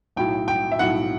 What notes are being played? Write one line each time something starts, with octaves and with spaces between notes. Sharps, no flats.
B1 A2 F#3 G5
G5
E5
B1 A2 F#3 F#5